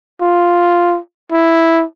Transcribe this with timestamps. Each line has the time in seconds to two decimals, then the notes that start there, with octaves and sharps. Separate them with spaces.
0.21 F4
1.32 E4